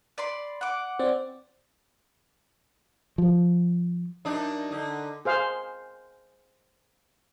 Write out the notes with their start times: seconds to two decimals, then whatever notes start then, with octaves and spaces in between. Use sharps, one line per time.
0.18 D5 B5 C6
0.61 F#5 D6
0.99 C4 D5
3.18 F3
4.25 F#2 D4 D#4
4.71 D3 D#4
5.25 G#4 C5 F5